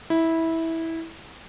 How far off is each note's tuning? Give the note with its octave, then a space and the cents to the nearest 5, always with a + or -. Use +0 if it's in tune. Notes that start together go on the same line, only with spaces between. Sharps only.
E4 -15